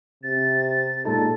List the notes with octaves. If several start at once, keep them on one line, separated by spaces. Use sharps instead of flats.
C3 A6
A#2 G#3 D#4 A4